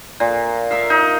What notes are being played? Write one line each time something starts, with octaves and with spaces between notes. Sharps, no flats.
A#2
A#4 E5 F5
D#4